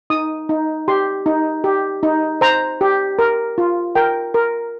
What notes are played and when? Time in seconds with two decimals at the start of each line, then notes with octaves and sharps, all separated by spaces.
0.10 D#4 D#6
0.49 D#4
0.88 G4 C6
1.26 D#4
1.64 G4
2.03 D#4
2.41 C5 A#5
2.81 G4
3.19 A#4
3.58 F4
3.95 A#4 G5
4.34 A#4